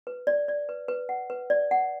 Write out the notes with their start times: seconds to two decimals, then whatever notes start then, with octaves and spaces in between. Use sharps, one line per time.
0.07 B4
0.27 D5
0.48 D5
0.69 B4
0.88 B4
1.09 F#5
1.30 B4
1.50 D5
1.71 F#5